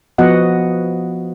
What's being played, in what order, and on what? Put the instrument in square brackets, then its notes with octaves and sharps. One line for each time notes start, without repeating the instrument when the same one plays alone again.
[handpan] F3 B3 F#4 D#5 F#5